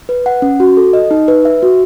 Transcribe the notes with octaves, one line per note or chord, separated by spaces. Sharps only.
B4
F#5
C#4
F#4
A4
D#5
D#4
B4
E5
F#4